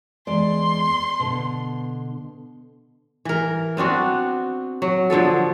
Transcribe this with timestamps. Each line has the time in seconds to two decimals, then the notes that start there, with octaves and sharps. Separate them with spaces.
0.27 E2 G#3 D5 C6
1.20 B2 D3
3.25 E3 A#4
3.77 B3 C4 D4 F#4
4.82 F#3
5.10 D3 F3 B3 A4